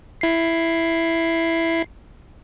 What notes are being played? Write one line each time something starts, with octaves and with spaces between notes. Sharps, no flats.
E4 C7